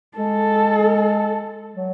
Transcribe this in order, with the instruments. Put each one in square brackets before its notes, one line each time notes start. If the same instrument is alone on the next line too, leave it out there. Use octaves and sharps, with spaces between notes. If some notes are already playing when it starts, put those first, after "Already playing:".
[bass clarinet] G#3 [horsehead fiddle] A4
[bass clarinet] F#3